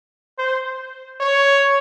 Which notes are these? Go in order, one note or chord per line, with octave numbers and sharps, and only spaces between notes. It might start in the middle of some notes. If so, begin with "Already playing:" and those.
C5
C#5